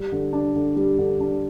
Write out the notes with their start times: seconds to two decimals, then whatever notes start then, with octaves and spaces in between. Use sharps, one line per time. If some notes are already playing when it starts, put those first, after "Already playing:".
Already playing: G3
0.12 D3
0.33 D4
0.56 D3
0.76 G3
0.99 D3
1.20 D4